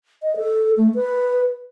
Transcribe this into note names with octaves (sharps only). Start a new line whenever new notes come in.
D#5
A4
A3
B4